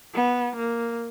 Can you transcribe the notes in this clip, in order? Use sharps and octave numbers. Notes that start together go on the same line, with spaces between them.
B3
A#3